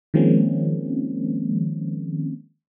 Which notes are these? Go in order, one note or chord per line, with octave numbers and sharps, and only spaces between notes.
D#3 F3 G#3 A#3 C4 C#4